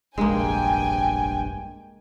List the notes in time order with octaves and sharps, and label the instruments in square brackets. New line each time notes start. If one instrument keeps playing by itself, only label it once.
[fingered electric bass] F1 A#1 G2 [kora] G#3 A#3 [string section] G5 G#5